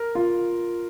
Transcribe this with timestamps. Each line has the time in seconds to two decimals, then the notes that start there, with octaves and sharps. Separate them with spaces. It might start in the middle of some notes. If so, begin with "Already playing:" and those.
Already playing: A#4
0.15 F4